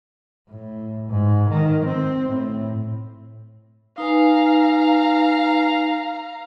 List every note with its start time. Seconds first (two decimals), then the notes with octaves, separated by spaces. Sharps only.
0.50 A2
1.09 G#2
1.49 D#3
1.85 C4
2.29 A2
3.98 D#4 B4 F5 G#5 A#5